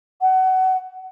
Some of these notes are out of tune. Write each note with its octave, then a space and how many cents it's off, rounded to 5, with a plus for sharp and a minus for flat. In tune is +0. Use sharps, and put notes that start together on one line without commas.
F#5 +25